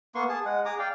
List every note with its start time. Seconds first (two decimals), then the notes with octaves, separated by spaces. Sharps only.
0.15 A#3 B3 C6 C#6
0.29 G#4 A5
0.45 G#3 F#5
0.65 G#4 A#5 D6 D#6
0.79 D5 F5 G5